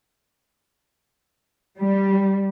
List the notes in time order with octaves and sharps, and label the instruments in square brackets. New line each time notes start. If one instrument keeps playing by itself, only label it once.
[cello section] G3